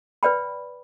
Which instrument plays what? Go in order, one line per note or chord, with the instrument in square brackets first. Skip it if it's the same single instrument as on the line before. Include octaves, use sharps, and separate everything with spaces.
[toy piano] B4 D5 G5 B5